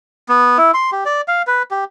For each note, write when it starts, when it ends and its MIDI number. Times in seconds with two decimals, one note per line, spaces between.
0.29 0.58 59
0.58 0.71 64
0.74 0.90 84
0.92 1.04 67
1.05 1.21 74
1.28 1.42 77
1.47 1.63 71
1.71 1.84 67